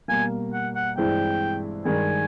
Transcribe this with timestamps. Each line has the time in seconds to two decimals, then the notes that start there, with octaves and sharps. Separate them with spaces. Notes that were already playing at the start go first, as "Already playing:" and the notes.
0.08 B2 G3 A#3 G#5
0.53 F#5
0.75 F#5
0.97 G2 E3 G#3 C4 E4 G5
1.85 G2 D#3 G#3 G#5